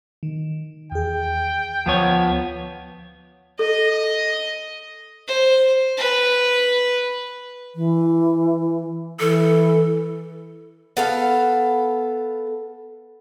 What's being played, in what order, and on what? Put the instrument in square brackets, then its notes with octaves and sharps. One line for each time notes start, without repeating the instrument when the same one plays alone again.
[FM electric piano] D#3
[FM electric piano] E2 G#4 [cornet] G5
[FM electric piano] D2 [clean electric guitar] F3 B3 C#5
[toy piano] A4 [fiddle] D#5
[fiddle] C5
B4
[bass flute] E3
[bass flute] E3 [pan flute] A4
[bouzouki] B3 A4 F5